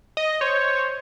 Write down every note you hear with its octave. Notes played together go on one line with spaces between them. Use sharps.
D#5
C5 C#5